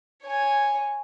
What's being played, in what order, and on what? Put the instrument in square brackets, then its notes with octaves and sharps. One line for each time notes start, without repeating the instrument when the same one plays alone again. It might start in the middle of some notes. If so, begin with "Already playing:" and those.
[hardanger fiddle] C#5 G#5